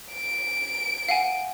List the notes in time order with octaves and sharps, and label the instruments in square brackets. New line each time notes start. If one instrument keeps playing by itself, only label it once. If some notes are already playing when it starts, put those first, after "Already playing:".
[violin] D7
[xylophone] F5 F#5 G#5